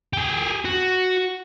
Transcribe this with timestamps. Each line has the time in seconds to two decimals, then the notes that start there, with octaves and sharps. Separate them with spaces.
0.13 G4 G#4
0.65 F#4